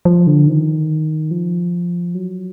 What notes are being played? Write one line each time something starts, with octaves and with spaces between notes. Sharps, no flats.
F3
D3
D#3
F3
F#3